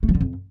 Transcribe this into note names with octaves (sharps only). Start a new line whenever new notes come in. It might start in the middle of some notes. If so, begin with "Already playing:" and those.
A3
F3
D3
F2